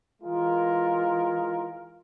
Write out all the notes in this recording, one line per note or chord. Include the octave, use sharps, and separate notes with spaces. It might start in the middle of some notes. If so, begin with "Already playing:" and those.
E3 G#3 F4 A#4